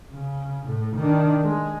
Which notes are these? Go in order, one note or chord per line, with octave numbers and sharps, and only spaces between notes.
C#3
A2
D#3 D4
G#3